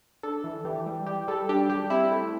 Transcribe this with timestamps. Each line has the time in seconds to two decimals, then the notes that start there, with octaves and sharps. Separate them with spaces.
0.23 D4 A4
0.44 E3
0.65 E3 G4
0.86 G3
1.06 G3 G4
1.28 G3 A4
1.49 D4 G4
1.69 G3 G4
1.90 C4 E4
2.11 A3